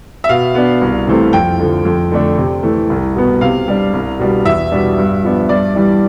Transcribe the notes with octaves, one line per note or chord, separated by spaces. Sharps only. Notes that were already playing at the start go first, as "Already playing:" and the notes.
E5
B2 F5
B3 D4
C2
C3 E3 A3 C4
F2 G5
D3 F3
F2
D3 A3 D4
C3
E3 A3
C2
B2 B3
C3 F5
G3 D4
C2
B2 G3 D4
E2 E5
B2 G3 D4
G2
F3 B3 D4
G2 D5
E3 G3 D4